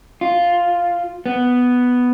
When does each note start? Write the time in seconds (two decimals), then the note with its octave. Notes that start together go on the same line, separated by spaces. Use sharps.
0.21 F4
1.26 B3